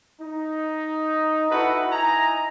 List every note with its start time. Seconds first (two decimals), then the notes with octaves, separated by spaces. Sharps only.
0.21 D#4
1.51 E4 F#4 A4 B4 D#5 F#5
1.91 D#4 E4 G#5 A#5